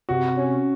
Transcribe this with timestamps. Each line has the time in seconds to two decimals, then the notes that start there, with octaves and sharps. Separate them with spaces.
0.09 C3 F#4
0.36 C#4